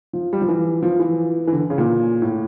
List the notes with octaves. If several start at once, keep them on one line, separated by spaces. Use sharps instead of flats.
F3
G3
F3
E3
F3
E3
E3
D3
C#3
A#2
A2